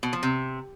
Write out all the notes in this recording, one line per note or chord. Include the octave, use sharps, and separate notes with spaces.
B2
F3
C3